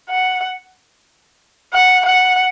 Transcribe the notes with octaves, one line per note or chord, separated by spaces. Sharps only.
F#5
F#5
F#5